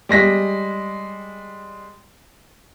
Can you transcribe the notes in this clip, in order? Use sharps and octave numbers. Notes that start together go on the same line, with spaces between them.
G3 G#3 A#6 B6